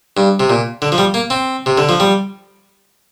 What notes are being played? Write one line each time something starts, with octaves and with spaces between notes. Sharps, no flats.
G2
C3
A#2
D3
F3
G3
A#3
C4
C3
D3
F3
G3